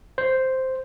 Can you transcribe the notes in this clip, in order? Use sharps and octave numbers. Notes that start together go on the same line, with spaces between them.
C5